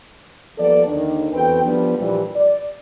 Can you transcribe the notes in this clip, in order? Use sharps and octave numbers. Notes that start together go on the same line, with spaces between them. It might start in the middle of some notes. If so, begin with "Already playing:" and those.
F3 G3 A#3 B3 A4 D5
D#2 D3 D#3 D4
E2 C4 F#4 A4 B4 G5
F3 G3 B3 D4
A#1 A#2 E3 F3 G3
D5